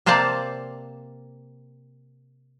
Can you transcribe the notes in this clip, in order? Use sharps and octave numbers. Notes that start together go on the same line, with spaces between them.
C3 A#3 C5 D5 F5 A5